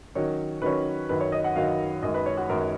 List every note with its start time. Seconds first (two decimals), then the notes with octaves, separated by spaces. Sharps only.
0.15 D#3 F#3 C#4 C#5
0.62 D#3 F#3 C#4 B4
1.09 F#2 D#3 F#3 B4
1.21 C#5
1.32 D#5
1.44 F#5
1.56 F#2 D#3 F#3 F5
2.02 F#2 D#3 G#3 D#5
2.14 B4
2.26 C#5
2.37 F#4
2.49 F#2 D#3 G#3 A#4